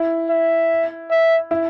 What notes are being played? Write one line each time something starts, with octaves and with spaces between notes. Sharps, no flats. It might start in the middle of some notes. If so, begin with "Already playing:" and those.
Already playing: E4
E5
E5
E4